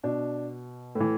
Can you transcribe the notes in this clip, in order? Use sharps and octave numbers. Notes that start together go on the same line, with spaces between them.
B2 D4
A2 E3